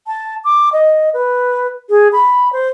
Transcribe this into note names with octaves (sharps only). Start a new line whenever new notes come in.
A5
D6
D#5
B4
G#4
B5
C5